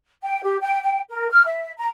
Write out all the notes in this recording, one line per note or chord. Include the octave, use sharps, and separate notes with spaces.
G5
G4
G5
G5
A#4
F6
E5
A#5